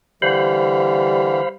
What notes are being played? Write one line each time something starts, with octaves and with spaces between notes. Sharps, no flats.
D3 E3 G3 C5 F5 B5